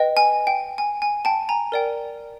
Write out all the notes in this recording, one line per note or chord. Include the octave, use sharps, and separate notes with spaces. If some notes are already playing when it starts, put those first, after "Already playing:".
Already playing: B4 D#5 G5
G#5
G5
G#5
G#5
G5 A5
G#5 A#5
A#4 D5 G5